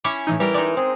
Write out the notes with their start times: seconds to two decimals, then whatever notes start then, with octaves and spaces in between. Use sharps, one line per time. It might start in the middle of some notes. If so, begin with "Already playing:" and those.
0.04 C#4 E4 C#5 D6 B6 C#7
0.27 A2 E3 D#4
0.40 E3 G3 G4 A#4
0.54 G#3 D#4 D5
0.77 C4 G#4